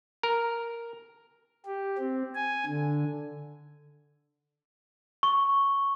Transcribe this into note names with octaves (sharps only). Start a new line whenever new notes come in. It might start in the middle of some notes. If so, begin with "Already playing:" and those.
A#4
G4
C4
G#5
D3
C#6